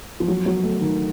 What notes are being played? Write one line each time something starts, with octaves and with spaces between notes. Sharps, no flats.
F3
F#3
F#3
A3
D#3